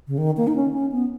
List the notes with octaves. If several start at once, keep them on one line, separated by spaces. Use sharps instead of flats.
C#3
D#3
A#3
D#4
C#4
C#4
B3